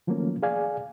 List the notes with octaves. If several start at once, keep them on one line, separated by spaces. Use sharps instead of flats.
D#3 F3 F#3 A3 A#3 C#4
G#4 D5 F5 G#5